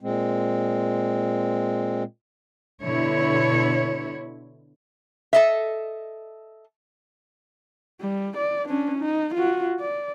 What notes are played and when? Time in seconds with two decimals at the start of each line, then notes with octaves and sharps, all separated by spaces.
0.01 A#2 G#3 C4
2.83 B2 D3 E4 C#5
5.33 A4 D#5 E5
8.01 G3
8.37 D5
8.69 C#4 D4
8.99 D#4
9.35 F4 F#4
9.80 D5